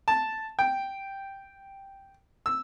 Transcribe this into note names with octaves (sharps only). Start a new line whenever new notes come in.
A5
G5
E6